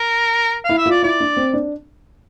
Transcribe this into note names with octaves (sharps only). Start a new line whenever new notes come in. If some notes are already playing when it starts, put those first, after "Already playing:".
Already playing: A#4
E4 F5
E5
F4 D5
E4 D5
D4
C4
D4